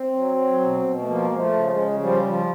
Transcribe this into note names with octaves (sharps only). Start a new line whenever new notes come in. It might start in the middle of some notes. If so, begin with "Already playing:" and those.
Already playing: C4
F#3
F#3
B2
B2
A3
F3 A#3
F3 G#3
A3
C#3
G#3
C#3
F3 G3
F3